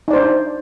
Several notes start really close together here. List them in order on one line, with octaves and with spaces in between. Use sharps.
D#4 D5 C5 D4